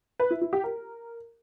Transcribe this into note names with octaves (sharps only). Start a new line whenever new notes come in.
B4
E4
E4
G4
A#4